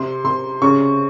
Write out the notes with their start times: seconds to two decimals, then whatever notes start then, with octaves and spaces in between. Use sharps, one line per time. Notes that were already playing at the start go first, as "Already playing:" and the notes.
Already playing: C3 C6
0.24 C3 C6
0.62 C#3 C#6